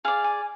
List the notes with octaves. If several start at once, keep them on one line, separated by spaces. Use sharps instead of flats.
G#4 D5 F5
G#5